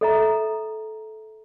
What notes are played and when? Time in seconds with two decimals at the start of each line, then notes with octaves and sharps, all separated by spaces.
0.01 A4 E5 A#5